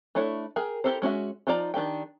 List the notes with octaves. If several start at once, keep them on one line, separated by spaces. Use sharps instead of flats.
A3 D4 E4 C#5
G#4 A#4 G5
E4 G4 A4 A#4 C5
G#3 C#4 F#4 E5
F3 D#4 F4 D5 A#5
D#3 D4 G4 G5